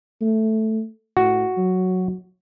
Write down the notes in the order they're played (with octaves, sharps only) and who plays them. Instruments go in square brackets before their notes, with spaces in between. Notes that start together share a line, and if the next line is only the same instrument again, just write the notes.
[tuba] A3
[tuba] A2 [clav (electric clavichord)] F#4
[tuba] F#3